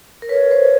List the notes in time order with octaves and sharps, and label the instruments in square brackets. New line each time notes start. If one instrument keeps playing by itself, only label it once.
[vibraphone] A#4
[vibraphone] B4 [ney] C#5
[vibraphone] C5